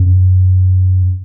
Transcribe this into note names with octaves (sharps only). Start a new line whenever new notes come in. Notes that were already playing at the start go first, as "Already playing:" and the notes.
Already playing: F#2